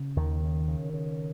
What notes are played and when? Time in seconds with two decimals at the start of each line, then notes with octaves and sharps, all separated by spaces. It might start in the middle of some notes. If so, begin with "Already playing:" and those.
Already playing: C#3
0.16 D#2 D#3
0.43 C#3
0.68 C#3
0.93 C#3